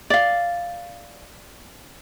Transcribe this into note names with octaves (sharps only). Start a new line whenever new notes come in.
D5 F5